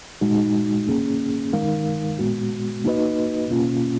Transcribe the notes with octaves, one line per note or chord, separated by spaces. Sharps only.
A#2 G#3 D#4 F#4
A#3 C#4 G#4
D#3 G#3 D#4 A#4 F5
A#2 G#3 B3 F#4
A#3 D#4 F#4 B4 D#5
B2 A#3 C#4 F4